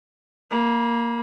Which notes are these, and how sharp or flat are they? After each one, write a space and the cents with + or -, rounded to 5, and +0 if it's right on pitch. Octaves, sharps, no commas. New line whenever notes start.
A#3 +0 B5 -35